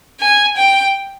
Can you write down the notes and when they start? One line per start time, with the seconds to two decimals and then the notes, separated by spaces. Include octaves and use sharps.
0.20 G#5
0.57 G5